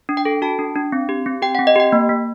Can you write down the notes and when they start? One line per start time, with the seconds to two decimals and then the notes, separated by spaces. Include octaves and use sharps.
0.09 D4
0.17 G5
0.25 A4
0.42 F#4 A5
0.59 D4
0.75 D4
0.92 C4
1.09 G4
1.26 C4
1.42 G4 G5
1.55 F#5
1.59 C4
1.67 D#5
1.76 G4 G5
1.92 A#3
2.09 A#3